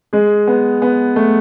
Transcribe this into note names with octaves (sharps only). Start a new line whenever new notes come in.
G#3 G#4
B3
B3
A3